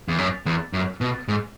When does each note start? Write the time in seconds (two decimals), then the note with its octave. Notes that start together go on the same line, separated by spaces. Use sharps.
0.08 E2
0.18 F#2
0.46 E2
0.73 F#2
1.01 B2
1.28 G#2